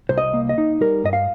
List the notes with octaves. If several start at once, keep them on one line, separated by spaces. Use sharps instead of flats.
C2 C5
D#5
A#3
D#5
D#4
G3 A#4
G2 D#5
F5